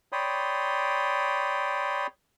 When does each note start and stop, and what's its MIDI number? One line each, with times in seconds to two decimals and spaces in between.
0.12 2.07 73
0.12 2.07 74
0.12 2.07 79
0.12 2.07 83
0.12 2.07 84
0.12 2.07 87